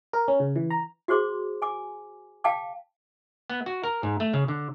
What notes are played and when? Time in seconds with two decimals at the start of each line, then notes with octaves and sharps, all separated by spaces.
0.13 A#4
0.28 C#4
0.40 C#3
0.56 E3
0.71 A#5
1.08 F#4 G#4 C5 C6 D6
1.62 G#5 D6
2.44 F5 G5 A5 D6
3.50 B3
3.66 F#4
3.84 A#4
4.03 G#2
4.20 A3
4.33 C#3
4.48 D3